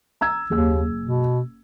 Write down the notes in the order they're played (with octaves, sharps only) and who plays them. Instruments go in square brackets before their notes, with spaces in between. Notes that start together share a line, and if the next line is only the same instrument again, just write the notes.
[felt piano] A#5 E6 G#6
[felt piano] F#1 G#4 E6 [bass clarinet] D#2
[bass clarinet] B2